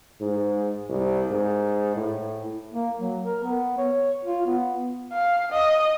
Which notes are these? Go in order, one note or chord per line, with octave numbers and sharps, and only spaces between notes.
G#2
C2
G#2
A2
A#3
F#3
A#4
B3
C#5
F4
B3
F5
D#5